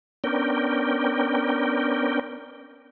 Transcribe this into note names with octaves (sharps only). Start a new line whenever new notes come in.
B3 C#4 D4 A#4 G5